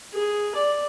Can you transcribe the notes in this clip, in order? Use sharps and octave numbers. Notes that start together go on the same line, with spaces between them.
G#4
D5